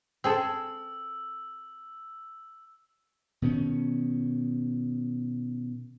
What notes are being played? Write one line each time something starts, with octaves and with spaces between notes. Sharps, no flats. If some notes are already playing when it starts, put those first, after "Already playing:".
C4 G#4 A4 E6
B2 D#3 C#4